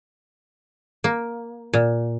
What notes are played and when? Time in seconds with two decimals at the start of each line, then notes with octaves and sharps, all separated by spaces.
1.04 A#3
1.74 A#2